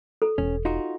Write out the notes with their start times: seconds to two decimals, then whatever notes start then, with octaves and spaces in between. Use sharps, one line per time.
0.22 A4
0.38 E1 C#4
0.65 D#4 F4 F#4